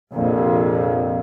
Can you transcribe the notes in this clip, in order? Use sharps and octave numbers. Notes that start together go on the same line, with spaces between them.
A#1 F2 C3